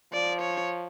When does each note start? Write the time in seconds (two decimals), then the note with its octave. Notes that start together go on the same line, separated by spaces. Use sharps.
0.13 F3 D5
0.41 C#5